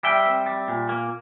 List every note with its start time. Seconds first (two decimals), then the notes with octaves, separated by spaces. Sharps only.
0.03 G3 E5 G5
0.26 C4
0.46 G3
0.68 A#2
0.89 A#3